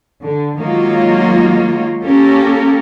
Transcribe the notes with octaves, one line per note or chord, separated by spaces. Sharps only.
D3
D#3 F#3 G#3 A#3 F4 C#5
A#3 C#4 G4 A4 A#4